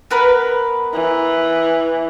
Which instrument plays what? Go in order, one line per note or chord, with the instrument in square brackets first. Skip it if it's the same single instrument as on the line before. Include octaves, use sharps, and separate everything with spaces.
[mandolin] B3 A#4 B4
[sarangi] E3